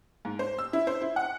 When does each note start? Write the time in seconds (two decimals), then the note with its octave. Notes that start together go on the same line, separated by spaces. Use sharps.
0.25 G#2
0.39 C5
0.58 E6
0.73 E4
0.87 C5
1.02 E4
1.16 F#5